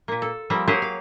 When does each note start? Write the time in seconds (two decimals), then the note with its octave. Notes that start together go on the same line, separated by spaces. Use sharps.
0.08 A#2 A#3
0.22 A4
0.50 F3 G3 A#3 C4
0.68 F#3 A#3 G4 G#4 C5 C#5
0.82 F5